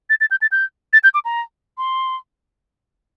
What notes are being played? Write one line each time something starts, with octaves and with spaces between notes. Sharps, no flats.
A6
A6
G6
A6
G6
A6
G6
D6
A#5
C6